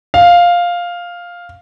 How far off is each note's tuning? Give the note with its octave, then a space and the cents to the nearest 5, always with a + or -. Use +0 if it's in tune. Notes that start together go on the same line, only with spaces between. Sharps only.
F5 +5